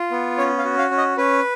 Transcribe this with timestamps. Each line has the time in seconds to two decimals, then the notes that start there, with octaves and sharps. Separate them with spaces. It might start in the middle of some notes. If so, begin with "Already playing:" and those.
Already playing: F4
0.11 B3
0.38 C#4 C#5
0.58 F5
0.65 F#4
0.78 F5
0.91 C#4
0.98 D#5
1.17 C#4 B4